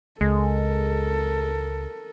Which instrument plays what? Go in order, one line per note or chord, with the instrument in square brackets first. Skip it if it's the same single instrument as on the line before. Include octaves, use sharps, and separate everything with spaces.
[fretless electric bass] C#2 [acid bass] G#3 [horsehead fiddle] A4 A#4